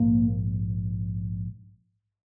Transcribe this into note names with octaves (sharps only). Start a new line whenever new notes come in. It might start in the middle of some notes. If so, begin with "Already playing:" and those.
Already playing: A#1 G#2 A#3